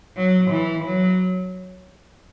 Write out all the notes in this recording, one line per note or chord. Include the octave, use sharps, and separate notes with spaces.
F#3
E3
F#3